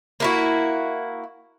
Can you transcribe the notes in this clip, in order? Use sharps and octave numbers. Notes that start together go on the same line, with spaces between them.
A#3 E4 F#4